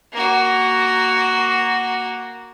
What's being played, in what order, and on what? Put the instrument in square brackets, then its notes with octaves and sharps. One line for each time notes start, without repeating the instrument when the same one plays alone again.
[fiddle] A#3 F#4